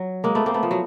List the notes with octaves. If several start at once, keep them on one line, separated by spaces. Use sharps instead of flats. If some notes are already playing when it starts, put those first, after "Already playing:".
Already playing: F#3
G#3 A#3
A3 B3
A#3 C4
A3 B3
F3
F#3